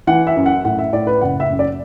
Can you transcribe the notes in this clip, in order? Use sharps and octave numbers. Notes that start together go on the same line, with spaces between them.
E3 F#5
E5
F#2
F#5
A2 F#5
E5
A2 D5
B4
F#1 F#5
E5
F#2
D5